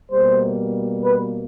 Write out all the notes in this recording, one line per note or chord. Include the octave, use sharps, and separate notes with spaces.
B2 G3 A#3 C5
B4